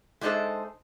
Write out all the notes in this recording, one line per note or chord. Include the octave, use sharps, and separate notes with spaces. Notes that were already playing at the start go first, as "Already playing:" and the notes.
G#3 D4 D#4 A4 C5 E5